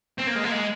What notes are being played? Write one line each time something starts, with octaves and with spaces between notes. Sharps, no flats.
C4
A#3
G#3
A#3
G#3